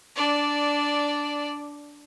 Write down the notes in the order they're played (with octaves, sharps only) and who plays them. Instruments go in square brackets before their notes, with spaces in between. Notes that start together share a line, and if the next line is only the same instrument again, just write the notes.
[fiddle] D4 D5